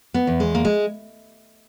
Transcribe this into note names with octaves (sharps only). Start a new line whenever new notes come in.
B3
E2
G#3
A#3
G#3